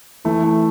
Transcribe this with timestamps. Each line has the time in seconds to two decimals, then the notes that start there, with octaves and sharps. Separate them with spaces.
0.25 E3 A3
0.44 A3